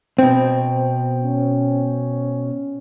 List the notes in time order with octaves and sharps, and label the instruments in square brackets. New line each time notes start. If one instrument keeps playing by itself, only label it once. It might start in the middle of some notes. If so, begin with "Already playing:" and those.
[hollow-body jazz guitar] B2 C4 [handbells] C5 G5
[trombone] C#4